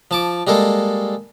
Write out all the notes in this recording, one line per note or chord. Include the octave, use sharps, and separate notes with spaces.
F3 A5 D6
G3 G#3 A#3 A4